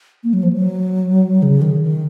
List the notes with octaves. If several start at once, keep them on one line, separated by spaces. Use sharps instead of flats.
A#3
F#3
F3
F#3
C#3
D#3
D#3